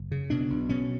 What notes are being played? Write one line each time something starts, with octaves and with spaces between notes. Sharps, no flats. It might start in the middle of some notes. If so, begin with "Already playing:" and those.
Already playing: F#1
C#3
B2 D4
B1
B2 C#4